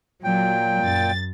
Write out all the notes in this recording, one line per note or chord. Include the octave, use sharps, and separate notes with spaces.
A#2 F#3 G5
F#2 A6